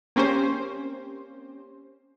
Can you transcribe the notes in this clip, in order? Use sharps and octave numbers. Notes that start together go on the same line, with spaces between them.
A#3 C4 C#4 G4 C5